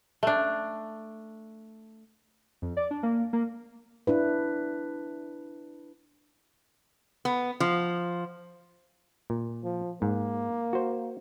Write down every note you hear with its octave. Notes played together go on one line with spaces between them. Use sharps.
A3 D4
F2
D5
D4
A#3
A#3
D4 E4 B4
B3
F3
A#2
F3
G#2 A#3
F#4 C5